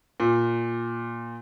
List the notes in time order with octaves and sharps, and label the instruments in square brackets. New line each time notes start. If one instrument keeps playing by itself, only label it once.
[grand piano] A#2